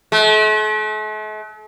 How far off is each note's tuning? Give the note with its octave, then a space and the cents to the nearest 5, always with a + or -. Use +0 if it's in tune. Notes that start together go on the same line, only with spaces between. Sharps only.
A3 -45